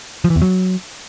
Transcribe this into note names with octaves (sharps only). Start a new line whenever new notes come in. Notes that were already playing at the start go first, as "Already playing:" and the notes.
F3
E3
E2
F#3